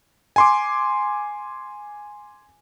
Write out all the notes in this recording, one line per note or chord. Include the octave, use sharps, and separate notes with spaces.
G#5 C6 D6